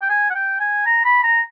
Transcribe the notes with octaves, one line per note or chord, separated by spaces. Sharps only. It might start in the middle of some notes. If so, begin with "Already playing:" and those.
G5
G#5
F#5
G5
G#5
A#5
B5
A#5